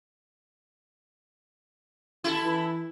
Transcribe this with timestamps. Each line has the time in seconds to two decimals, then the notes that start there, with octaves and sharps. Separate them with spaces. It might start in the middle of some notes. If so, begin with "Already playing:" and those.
2.24 E4 A4
2.44 E3